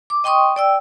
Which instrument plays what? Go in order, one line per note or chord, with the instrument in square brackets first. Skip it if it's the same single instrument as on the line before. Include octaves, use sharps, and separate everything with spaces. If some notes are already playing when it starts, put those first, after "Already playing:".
[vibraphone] D6
D#5 G5 C6 C#6 D#6
D5 G5 E6